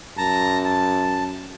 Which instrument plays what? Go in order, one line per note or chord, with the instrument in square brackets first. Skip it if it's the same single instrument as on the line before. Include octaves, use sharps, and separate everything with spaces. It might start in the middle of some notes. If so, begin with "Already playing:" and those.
[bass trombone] F#2 [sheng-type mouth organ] A5 A#5
[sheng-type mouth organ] A5